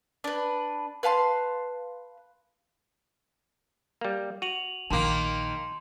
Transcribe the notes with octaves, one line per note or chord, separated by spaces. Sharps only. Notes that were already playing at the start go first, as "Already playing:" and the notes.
D4 B4
B4 F5 A5 C6
G3 A#3
F#4 D#7 F7 F#7
A#1 D#3 A#3 A5 C6